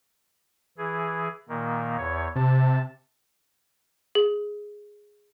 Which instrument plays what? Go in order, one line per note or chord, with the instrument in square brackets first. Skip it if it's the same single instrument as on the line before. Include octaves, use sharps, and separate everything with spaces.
[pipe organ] E3 G#4
A#2 D#3 A#3
E2 C#5
[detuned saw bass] C3 [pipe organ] A5
[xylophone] G#4